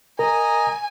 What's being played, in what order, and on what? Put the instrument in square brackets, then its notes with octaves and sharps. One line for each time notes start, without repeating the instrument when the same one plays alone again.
[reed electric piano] A#4 [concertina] D#5 A#5 [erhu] G#5